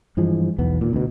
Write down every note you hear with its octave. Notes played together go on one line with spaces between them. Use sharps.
G2 E3 F3 G#3
B1 E2 B3
D#2 A#2
D2 B2